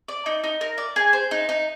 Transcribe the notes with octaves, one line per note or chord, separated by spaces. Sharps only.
D5
D#4
D#4
A#4
D5
G#4
C5
D#4
D#4